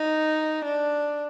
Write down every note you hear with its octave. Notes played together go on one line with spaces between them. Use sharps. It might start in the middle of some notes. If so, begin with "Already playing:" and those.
Already playing: D#4
D4